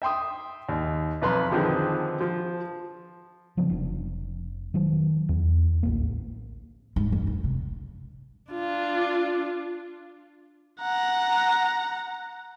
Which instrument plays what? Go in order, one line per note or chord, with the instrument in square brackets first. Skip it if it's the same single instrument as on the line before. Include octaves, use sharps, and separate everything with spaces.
[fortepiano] E5 G5 C6 D#6
D#2
B1 F2 B4 A#5 C6
D3 D#3 F3 C4 G#4 B4
F3
[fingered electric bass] C#3 F3 F#3 B3
F1 C4 D4
D#3 F#3
E2
D1 A1 A#3
[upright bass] G#2
F2
F#2
C3
[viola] D4 F4
[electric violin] F#5 A#5